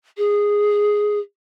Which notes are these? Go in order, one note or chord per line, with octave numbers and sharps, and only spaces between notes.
G#4